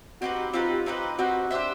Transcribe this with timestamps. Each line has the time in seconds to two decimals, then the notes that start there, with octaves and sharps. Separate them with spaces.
0.21 C4 D#4 F#4 G4 B4
0.53 C4 D#4 F4 G4 B4
0.86 C4 D#4 G4 B4
1.19 C4 D#4 F#4 G4 B4
1.51 D4 G4 C5 E5